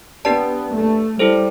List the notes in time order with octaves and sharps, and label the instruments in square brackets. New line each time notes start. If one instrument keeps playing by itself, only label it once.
[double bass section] B3 [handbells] D4 G4 B4 D5 A5
[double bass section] A3
[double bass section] G3 [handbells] E4 A4 C5